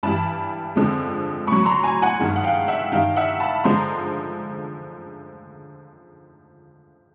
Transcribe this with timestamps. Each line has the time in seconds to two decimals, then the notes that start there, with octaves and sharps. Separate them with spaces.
0.03 G2 E3 G3 A5 B5
0.76 F2 D3 F3 G#3
1.47 A2 F#3 B5 C#6
1.65 A#5 C6
1.84 G#5 A#5
2.02 F#5 G#5
2.20 G2 D#3 G#3
2.36 F#5
2.44 F5 G5
2.68 E5 F#5
2.92 G2 D#3 G3 F5 G5
3.16 E5 F#5
3.40 A5 B5
3.64 D3 F3 G#3 A#5 C6